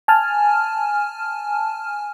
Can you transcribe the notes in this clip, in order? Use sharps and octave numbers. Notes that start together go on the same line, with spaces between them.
G#5 A5 F6